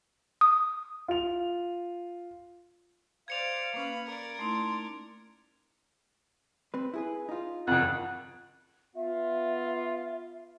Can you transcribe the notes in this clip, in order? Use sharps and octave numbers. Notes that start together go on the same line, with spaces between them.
D#6
F4 F7
C5 D5 F5 G#6 C#7 F7
A#3 C#4 B4 B5
A#4 D5
A3 D#4 E4 C6
C4 B4
E4 G#4 B4
D#4 F4
F#1 F2 F#5
B3 F4 E5